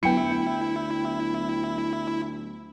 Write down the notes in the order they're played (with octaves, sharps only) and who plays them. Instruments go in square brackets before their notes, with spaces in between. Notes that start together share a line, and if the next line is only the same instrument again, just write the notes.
[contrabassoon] D2 [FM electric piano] F#3 B3 [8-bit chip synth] E4 [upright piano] G5 C#7